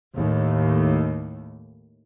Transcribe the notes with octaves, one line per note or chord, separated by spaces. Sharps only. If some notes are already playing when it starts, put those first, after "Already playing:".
D#2 A2